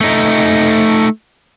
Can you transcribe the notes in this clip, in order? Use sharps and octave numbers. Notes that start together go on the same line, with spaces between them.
A3 D#4